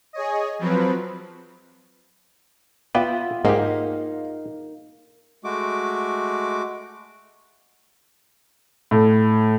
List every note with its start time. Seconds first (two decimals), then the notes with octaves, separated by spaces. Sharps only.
0.13 G#4 C#5 D#5
0.59 F3 F#3 C4 B4
2.95 B3 F4 B4 D5 E5 F#5 G5
3.45 G#2 A#3 D#4 G4 D#5 F5 F#5
5.44 G#3 A3 F#4 D6
8.91 A2